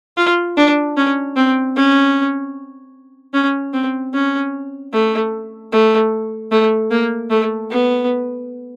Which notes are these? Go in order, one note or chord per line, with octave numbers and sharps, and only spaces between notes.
F4
D4
C#4
C4
C#4
C#4
C4
C#4
A3
A3
A3
A#3
A3
B3